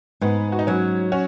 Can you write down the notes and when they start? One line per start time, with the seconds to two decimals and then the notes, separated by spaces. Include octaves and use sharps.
0.21 G#2 B3
0.52 F#4
0.59 D#4
0.67 F#3 C#4
1.12 C#4 F#4